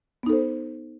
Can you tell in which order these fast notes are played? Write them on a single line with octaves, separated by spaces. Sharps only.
B3 D#4 A4 C5